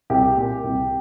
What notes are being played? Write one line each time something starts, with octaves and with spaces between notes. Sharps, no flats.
C2 G4
A#2
C2